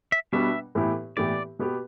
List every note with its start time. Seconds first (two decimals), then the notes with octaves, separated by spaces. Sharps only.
0.12 E5
0.32 B2 G3 B3 D4 E5
0.75 A2 E3 B3 E4 G4
1.17 A2 E3 B3 E4 G4 D5
1.59 B2 B3 G4